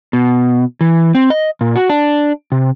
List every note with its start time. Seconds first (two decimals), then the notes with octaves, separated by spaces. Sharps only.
0.13 B2
0.81 E3
1.15 C4
1.30 D#5
1.61 A#2
1.75 F#4
1.89 D4
2.52 C3